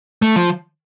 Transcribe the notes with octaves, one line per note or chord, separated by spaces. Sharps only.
A3
F3